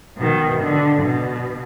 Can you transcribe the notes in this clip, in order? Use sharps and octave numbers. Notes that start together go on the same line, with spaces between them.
B2 D#3
D3
B2